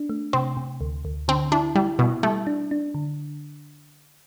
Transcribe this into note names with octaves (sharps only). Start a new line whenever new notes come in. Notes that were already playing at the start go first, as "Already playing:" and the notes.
Already playing: D4
A3
C3 C4
C3
D2
D2
D3 C4
D4 E4
G3 E4
B2 E4
G3 A3
D4
D4
D3